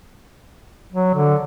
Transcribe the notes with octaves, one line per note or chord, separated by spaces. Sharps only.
F#3
D3